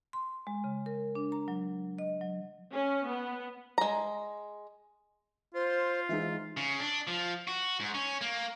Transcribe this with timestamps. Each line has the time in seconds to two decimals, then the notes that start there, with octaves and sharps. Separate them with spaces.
0.13 C6
0.47 G#3
0.64 C#3
0.86 A#4
1.15 D4
1.32 A#5
1.48 F#3
1.98 D#5
2.21 F#3
2.73 C#4
3.07 B3
3.78 G#3 A#5
5.54 F4 C5
6.09 E3 G#3 D#4 E5
6.57 C#3
6.80 D4
7.07 F3
7.47 F#4
7.80 G#2
7.94 C#4
8.21 A#3